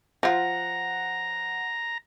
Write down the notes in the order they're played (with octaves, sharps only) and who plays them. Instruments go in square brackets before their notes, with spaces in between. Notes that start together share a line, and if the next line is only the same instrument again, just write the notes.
[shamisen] F3 F4 [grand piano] F#5 [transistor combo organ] A#5